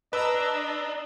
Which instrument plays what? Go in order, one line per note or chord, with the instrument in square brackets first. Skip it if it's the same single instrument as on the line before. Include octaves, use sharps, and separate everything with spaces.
[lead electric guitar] D4 [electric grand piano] B4 [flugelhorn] D#5 [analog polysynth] A#5 E6